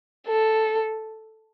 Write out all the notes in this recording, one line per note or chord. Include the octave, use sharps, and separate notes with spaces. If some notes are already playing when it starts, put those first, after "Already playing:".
A4